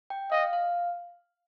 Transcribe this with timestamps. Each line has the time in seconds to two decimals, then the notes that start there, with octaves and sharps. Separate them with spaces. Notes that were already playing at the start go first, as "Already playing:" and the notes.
0.10 G5
0.31 D#5 F5
0.53 F5